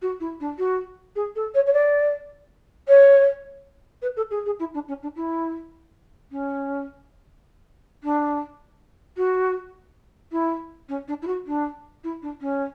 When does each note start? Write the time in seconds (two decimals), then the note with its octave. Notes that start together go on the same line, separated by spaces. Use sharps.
0.01 F#4
0.20 E4
0.40 D4
0.58 F#4
1.15 G#4
1.35 A4
1.54 C#5
1.66 C#5
1.73 D5
2.88 C#5
4.02 B4
4.16 A4
4.30 G#4
4.45 G#4
4.59 E4
4.74 D4
4.88 C#4
5.02 D4
5.16 E4
6.31 C#4
8.03 D4
9.17 F#4
10.31 E4
10.88 C#4
11.07 D4
11.22 E4
11.27 F#4
11.46 D4
12.03 E4
12.22 D4
12.40 C#4